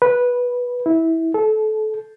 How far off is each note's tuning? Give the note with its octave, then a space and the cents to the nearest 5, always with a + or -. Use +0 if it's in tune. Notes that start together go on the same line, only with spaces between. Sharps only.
B4 -10
E4 -20
A4 -25